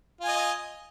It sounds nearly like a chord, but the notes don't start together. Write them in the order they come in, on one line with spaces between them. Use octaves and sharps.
F4 G#5 D#5